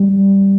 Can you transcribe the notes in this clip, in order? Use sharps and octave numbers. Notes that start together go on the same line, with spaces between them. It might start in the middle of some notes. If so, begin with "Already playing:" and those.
Already playing: G3